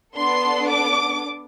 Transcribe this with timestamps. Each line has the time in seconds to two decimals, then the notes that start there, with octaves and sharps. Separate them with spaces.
0.16 B3 D4 A4 C6
0.69 D6